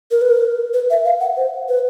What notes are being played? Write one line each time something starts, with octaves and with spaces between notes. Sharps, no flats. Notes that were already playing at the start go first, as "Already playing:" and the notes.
A#4
B4
A#4
B4
E5
F5
F#5
C5
B4